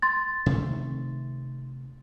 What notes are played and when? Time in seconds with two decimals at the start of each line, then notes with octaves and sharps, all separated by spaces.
0.02 C6 A6
0.46 C3 D#3 A3